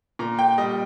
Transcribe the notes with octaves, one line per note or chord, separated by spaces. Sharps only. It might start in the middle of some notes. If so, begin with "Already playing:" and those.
A#2 A#5
G5
G3 D#5